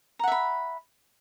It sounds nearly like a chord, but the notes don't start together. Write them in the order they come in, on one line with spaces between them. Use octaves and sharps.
A#5 F#5 E5 B5